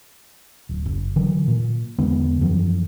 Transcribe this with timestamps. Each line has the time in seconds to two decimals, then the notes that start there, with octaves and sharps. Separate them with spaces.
0.69 D1
0.86 F#1
1.16 D3 E3 F#3
1.48 A#2
1.98 E2 D3 G#3 B3
2.41 F#2 E3 F3